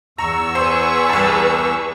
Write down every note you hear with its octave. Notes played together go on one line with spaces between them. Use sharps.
E2 A#5 C#6 E6
G#4 B4 C5
C2 A5